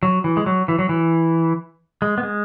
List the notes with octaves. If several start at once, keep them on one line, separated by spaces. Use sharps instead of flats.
F#3
E3
G#3
F#3
E3
F#3
E3
G#3
B3
G#3